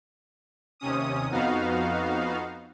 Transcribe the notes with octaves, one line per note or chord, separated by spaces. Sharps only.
D#2 C3 C#4 D#6
F2 B3 D#4 F#4 F5